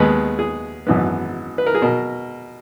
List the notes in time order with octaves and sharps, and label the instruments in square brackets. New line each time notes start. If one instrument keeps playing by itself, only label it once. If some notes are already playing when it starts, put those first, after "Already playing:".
Already playing: [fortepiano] D#2 D#3 G#3 B3 B4
G#4
G#1 F#2 E3 B3
B4
A#4
G#4
B2 A#4